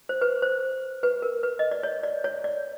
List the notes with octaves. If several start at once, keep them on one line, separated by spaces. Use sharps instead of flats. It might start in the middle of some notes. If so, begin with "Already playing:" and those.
C5
B4
C5
B4
A#4
B4
D#5
D5
C#5
D5
C#5
D5